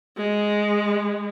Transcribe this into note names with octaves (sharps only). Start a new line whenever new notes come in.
G#3